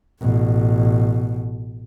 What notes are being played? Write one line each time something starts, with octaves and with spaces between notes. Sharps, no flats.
A1 B2